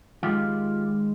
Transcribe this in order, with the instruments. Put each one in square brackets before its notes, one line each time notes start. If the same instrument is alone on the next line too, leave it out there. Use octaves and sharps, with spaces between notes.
[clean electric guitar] D#3 G#3 F4 G4